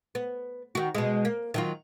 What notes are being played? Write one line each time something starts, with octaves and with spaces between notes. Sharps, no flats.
B3
D#3 F#4
B2 G#3
A#3
D#3 F#3 F4